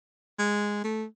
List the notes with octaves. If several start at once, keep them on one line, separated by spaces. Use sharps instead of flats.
G#3
A3